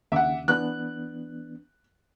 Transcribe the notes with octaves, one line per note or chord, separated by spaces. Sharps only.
D#2 C#3 E5 F#5 D6
E3 B3 D4 F#6